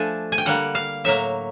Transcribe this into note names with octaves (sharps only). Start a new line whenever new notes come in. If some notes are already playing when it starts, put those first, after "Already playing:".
Already playing: F3 A3 D4 G#5
G#5
G5
D3 G3 A#3 F#5
F5
A2 F#3 A#3 E5